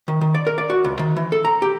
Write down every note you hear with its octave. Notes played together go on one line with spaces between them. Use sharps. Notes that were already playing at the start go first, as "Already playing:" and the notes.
D#3
D#3
D5
A#4
D5
F#4
C#2
D#3
E3
A4
A#5
G4